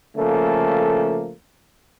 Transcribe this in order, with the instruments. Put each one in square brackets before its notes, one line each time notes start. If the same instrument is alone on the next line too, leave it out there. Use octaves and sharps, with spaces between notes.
[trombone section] C#3 F3 A3 A#3 A4